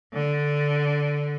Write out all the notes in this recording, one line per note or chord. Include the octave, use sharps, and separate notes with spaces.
D3